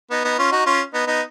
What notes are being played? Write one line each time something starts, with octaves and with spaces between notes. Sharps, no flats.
B3 D#4
B3 D#4
C#4 F4
D#4 F#4
C#4 F4
B3 D#4
B3 D#4